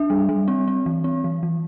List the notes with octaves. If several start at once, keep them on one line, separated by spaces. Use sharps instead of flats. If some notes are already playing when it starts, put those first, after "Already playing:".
Already playing: D4 E5
G3
G3
C4
C4
E3
C4
E3
E3